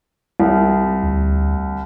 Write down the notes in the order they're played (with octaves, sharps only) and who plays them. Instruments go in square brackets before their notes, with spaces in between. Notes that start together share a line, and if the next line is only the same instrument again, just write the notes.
[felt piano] C2
[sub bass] D2